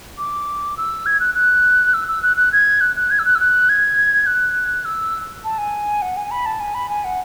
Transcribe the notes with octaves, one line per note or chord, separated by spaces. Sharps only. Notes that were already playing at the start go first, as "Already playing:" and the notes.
D6
E6
G#6
F#6
F#6
E6
E6
F#6
F#6
G#6
F#6
F#6
G#6
E6
F#6
E6
F#6
G#6
F#6
E6
A5
G#5
F#5
G#5
B5
A5
G#5
B5
G#5
F#5